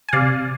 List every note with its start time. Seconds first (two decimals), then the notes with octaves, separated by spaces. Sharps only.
0.09 G#5
0.13 C3 D5 F5